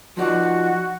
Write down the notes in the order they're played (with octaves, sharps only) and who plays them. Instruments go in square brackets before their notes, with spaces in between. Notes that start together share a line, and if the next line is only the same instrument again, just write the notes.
[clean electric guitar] F3 D#4 D5 [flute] F#4